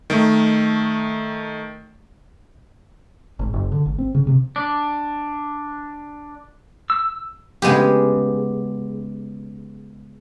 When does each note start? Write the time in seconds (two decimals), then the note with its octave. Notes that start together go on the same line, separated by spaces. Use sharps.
0.10 D#3 A3
3.39 G#1
3.54 F#1
3.72 D3
3.86 G#1
3.98 C4
4.15 C#3
4.27 C3
4.56 D4
6.90 E6
7.62 C#3 G#3 B3 G4